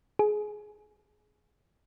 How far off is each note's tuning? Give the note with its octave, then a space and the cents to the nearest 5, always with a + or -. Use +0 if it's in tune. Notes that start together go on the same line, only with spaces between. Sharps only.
G#4 +20